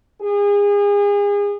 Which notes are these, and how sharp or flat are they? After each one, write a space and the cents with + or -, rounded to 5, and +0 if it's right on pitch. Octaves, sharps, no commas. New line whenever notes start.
G#4 -35